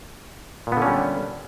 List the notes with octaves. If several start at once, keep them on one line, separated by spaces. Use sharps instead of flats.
A#2 D3 G3 B3 C#4